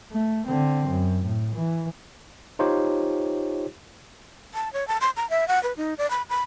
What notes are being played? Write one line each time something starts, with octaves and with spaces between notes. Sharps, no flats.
A3
D3 C4
F#2
A2
E3
D#4 F4 G4 C5 C#5
A5
C#5
A5
C6
A#5
E5
F#5
B4
D#4
D5
B5
B5